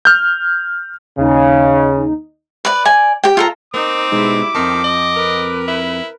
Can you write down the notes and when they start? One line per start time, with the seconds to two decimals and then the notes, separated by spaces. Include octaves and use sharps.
0.05 F6 G6
1.17 D#2 C#3 D#4
2.65 B4 D5
2.85 D5 G#5
3.24 G4 G5
3.37 F4 A4 A#5
3.74 A#3 C4 D#4 D6
4.12 B2 G3 G#3 D#4 E4
4.55 F2 D#3 F3 C4 A5
4.84 D#5
5.12 A#4 B4
5.68 E4